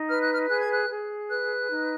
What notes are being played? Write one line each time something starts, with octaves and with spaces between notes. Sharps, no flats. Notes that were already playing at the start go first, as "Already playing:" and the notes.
Already playing: D#4
B4 F6
F#6
F6
G#4 F#6
G#6
F#6
G#4
B4 F#6
D#4